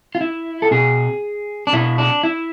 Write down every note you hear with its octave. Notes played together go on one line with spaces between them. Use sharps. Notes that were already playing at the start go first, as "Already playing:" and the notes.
F4
E4
A4
B2 G#4
D4
B2 E4
D4
E4